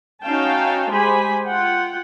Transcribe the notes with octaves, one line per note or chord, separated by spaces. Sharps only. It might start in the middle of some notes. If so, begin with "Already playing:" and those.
C#4 D#4 F#4 F5 G5 A5
G#3 G4 C5 G#5 B5
F4 F#5 G5